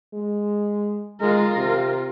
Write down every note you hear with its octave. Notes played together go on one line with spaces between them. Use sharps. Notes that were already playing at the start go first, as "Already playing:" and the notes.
G#3
G#3 F4 A#4
C3